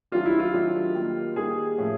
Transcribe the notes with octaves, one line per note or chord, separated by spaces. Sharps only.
D#3 F#3 A3 D4 F4 G4
E4
F4
D#3 F#3 A3 D4 G4
D#3 G3 A#3
D#3 G3 A#3 G#4
A2 F3 A3 C#4 F4